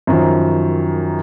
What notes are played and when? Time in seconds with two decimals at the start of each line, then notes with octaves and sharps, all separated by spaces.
0.07 F#2 D#3 F3